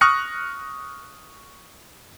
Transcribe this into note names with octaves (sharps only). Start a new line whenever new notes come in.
C#6 D#6 F6 F#6 A#6 C#7